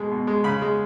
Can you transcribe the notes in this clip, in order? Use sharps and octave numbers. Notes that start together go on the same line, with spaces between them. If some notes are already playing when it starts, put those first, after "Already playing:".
Already playing: B2 G#3
B2
G#3
C#3 B5
G#3